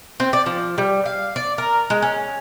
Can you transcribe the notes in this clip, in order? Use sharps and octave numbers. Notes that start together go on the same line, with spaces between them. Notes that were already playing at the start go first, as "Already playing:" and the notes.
C4
D5
F3
G3
F5
D5
A#4
G#3
C#4